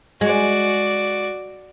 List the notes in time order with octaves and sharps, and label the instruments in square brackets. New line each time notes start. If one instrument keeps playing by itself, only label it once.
[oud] G#3 [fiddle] F#4 D5